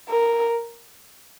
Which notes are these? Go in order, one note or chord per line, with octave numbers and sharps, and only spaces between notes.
A#4